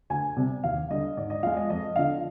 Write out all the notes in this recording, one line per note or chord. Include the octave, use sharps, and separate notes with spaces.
D2 G#5
C3 G3
D#2 F5
D3 G3 D#5
G#2 D5
D#5
F3 G#3 F5
D#5
F2 D#5
D3 F3 F5